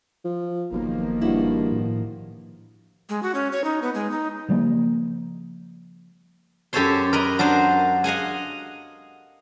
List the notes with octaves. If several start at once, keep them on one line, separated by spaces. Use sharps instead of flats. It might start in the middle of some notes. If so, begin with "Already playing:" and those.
F3
F#1 B1 D#3 F3 A#3
G2 E4 F#4
A2
G#3
F#4
C#4
C#5
D#4
B3
G#3
D#4
C#3 F3 G3 A#3
F#2 G4 A4 C5 C#5 C6
A#4 B4 D#5
F#3 D4 A#4 C5
D#5 F5 F#5 G#5